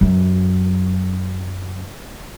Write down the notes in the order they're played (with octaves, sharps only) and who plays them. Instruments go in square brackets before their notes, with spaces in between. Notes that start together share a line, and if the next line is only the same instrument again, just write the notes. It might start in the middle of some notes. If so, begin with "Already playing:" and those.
[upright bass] F#2 F#3